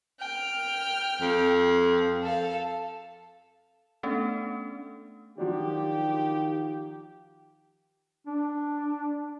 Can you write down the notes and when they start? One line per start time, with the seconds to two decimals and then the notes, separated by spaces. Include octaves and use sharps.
0.19 G5 F6
1.21 F2
2.22 A4 F5
4.03 A3 B3 C#4 D4 A4
5.38 D#3 F3 F#3 D4 F4 G4
8.27 D4